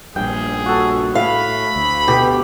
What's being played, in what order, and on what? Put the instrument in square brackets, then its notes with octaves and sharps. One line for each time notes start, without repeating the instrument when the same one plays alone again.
[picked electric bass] A#1 G2 [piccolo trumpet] G#4 [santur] G5
[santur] F#4 A4
[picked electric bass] A2 [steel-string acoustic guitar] F5 [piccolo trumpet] B5
[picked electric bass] D2
[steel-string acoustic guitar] B2 [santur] G4